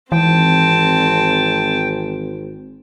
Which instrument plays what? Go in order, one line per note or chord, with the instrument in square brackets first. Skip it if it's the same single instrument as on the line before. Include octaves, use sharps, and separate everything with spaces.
[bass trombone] G#1 [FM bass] E3 [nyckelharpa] C4 A5 [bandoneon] G5